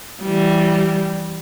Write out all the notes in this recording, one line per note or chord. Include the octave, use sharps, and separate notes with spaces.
E3 G3